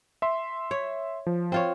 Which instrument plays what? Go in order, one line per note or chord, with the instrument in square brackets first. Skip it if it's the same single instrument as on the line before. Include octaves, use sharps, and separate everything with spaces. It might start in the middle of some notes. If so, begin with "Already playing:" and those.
[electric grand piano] E5 C6
[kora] C#5
[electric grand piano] F3
[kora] C4 F4 C#5